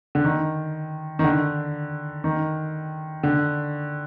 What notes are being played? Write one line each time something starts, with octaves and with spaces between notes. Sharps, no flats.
D3
D#3
D#3
D3
D#3
D3